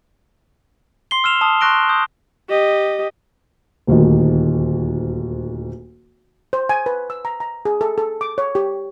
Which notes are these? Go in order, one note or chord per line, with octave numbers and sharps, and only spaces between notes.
C6 C7 G7
E6 F6 E7 F7
A5 D#6
C6 C#6 F#6 A#6 D7 G7
D#6 G6
G4 D#5
D#1 D2 D#3
C5
G#5
B4
E6
A#5
A#5
G#4
A4
A4
D6
C#5
G4